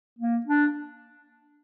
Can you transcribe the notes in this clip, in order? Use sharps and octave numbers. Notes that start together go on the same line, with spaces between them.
A#3
D4